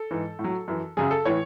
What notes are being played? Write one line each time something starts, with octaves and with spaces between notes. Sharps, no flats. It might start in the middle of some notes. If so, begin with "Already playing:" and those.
Already playing: A4
G#2 E3
A2
F#3
F#2 E3
F#2 C#3 F#3 G#4
A4
A2 E3 C#5